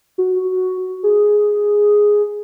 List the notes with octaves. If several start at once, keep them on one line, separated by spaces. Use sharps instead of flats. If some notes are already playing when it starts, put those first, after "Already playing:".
F#4
G#4